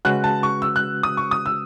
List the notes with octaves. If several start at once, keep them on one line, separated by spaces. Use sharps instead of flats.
C#3 G#3 C#4 F#4 B4 F#6
A5
C#6
E6
F#6
D#6
C#6
D#6
E6